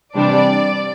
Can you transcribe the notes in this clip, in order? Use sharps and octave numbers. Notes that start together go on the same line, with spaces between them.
C3 E3 G3 D4 D5